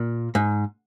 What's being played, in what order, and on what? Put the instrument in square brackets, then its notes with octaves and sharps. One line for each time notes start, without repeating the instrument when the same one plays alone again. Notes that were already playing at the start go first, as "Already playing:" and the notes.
Already playing: [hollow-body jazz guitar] A#2
G#2